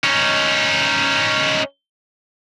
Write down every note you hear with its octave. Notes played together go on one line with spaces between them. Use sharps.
C#4 D#4